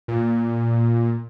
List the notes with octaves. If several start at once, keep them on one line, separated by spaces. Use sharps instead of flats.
A#2